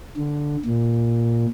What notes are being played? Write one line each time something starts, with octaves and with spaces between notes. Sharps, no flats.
D3
A#2